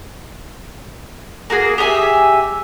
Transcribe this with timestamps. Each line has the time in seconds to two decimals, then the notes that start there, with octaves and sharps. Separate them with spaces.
1.50 A#3 F#4 G#4
1.78 G4 G#4 E5 G#5